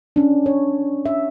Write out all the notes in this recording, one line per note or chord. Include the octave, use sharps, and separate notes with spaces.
C#4 D4
C#5
E5